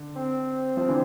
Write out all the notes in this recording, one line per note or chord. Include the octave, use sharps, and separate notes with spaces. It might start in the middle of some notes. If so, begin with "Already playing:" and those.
Already playing: D3
C4
F3
D3 E3